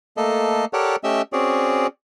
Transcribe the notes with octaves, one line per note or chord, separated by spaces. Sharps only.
A3 A#3 A4 D#5
G4 A4 A#4 C#5 D5 F#5
A3 C#4 G4 D#5 E5
C4 C#4 F#4 G#4 D5